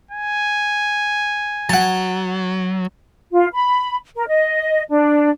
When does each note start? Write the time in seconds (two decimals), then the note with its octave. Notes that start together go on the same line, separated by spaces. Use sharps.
0.11 G#5
1.69 F#3 F#5 A5
3.32 F4
3.53 B5
4.15 A#4
4.27 D#5
4.89 D4